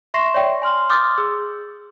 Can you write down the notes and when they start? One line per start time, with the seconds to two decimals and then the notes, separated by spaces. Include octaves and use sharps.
0.14 E5 C6 C#6 A#6 C7 E7
0.34 C#5 D5 E5 G5
0.62 G#5 C6 F6 F#7
0.90 C6 D6 D#6 F6 G6 A6
1.18 G#4 E6